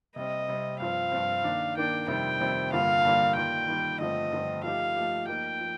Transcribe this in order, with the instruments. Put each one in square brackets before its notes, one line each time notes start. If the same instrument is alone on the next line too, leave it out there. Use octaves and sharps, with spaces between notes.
[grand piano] C3 G3 C4 [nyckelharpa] D#5
[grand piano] C3 G3 C4
[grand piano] G2 F3 C4 [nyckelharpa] F5
[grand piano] G2 F3 C4
D#3 A#3 D4
[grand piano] D#3 A#3 D4 [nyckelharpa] G5
[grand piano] F2 C3 D#3 G3 C4 [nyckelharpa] G5
[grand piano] F2 C3 D#3 G3 C4
[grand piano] G2 D3 G3 A#3 F4 [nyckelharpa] F5
[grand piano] G2 D3 G3 A#3 F4
[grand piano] D#3 G3 A#3 F4 [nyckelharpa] G5
[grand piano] D#3 G3 A#3 F4
[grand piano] G2 D3 F3 A3 C4 [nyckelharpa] D#5
[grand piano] G2 D3 F3 A3 C4
[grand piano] F3 A3 D#4 G4 [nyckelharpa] F5
[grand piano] F3 A3 D#4 G4
[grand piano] F3 A#3 D#4 [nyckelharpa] G5
[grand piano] F3